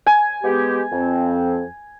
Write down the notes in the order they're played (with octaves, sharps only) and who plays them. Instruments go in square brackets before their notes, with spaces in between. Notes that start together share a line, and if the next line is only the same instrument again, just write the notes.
[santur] G#5
[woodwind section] G#3 B3 G4
F2 C4